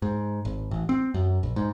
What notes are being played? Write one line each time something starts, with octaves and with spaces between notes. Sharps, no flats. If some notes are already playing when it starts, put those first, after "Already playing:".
G#2
G#1
A1
C4
F#2
A#1
G#2